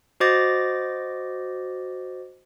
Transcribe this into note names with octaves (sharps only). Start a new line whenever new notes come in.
F#4 C5 D#5 D6 A6 A#6